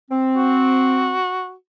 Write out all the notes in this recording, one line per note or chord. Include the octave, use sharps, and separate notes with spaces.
C4
F#4